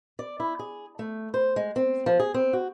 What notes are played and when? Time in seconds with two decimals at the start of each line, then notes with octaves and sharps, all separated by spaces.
0.19 D5
0.40 E4
0.59 G#4
0.99 A3
1.34 C5
1.56 G#3
1.76 C4
2.06 F3
2.19 G#4
2.34 C4
2.53 F#4